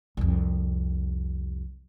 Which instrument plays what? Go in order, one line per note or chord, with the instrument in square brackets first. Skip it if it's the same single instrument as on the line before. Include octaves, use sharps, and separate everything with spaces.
[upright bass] C2 F2